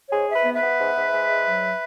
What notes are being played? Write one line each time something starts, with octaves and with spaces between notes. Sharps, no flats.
G#2 G#4 C#5
G#2
B4 E5
B3
B4 E5
B3
G#2
G#2
G#3
G#2
F#3